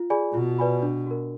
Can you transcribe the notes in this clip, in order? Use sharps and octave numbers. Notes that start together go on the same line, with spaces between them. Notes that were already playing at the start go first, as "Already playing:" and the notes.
Already playing: F4
G#4 D5 G#5 B5
B2 F4
B4 D5 G#5 B5
D4
F#4 A#4